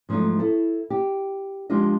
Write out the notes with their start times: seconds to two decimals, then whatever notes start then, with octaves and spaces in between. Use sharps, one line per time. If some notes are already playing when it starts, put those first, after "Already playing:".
0.09 G#2 F3 F#3 A3 D#4
0.39 E4 A4
0.90 G4
1.70 F3 G#3 D4 F4 G4 D#5